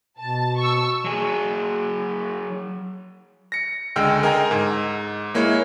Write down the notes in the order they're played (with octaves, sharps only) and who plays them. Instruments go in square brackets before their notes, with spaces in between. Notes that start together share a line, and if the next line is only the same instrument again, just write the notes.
[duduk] B2 [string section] A5
[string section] C#6 E6
[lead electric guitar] F#3 G#4
[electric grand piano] A#6 C#7
C#2 D3 G#3 G5 E6 F6
G#4 A#4 D#5 G5 G#5 A#5
G#2
G#3 A#3 E4 C#5